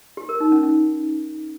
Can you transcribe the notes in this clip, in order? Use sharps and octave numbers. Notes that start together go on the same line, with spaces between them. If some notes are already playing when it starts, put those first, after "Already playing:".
G4
A#4
D#4
C#4
C#4